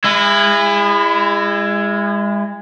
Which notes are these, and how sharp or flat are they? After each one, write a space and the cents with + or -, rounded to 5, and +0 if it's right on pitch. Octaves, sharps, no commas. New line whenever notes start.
G#3 -30 E4 +20